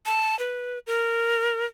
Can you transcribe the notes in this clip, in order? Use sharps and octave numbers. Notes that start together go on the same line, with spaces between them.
A5
B4
A#4